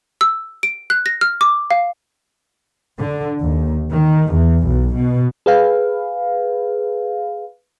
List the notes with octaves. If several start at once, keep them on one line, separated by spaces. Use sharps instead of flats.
E6
D7
F#6
A#6
F6
D6
F5
D3
D#2
D#3
E2
B1
B2
G#4 B4 F5